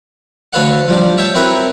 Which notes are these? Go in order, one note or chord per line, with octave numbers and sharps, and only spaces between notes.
D2 A4 B4 C#5 F5 F#5
F3 G3 D4
C#5 E5 G5 A5
C4 E4 F#4 A#4 B4 C#5